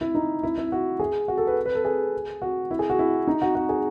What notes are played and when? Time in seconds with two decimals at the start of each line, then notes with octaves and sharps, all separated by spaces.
0.01 E4
0.15 D#4
0.43 E4
0.58 E4
0.72 F#4
1.00 G#4
1.28 F#4
1.38 A4
1.47 B4
1.66 B4
1.75 A4
1.85 G#4
2.42 F#4
2.71 E4
2.79 G#4
2.90 F#4
2.99 E4
3.27 D#4
3.42 F#4
3.55 F#4
3.69 G#4